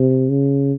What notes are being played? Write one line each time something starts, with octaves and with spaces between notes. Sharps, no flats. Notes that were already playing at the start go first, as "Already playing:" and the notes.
Already playing: C3
C#3